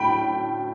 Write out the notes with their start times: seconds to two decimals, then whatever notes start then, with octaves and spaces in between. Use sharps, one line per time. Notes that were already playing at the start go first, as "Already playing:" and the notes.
Already playing: D2 A2 G5 B5
0.10 F#3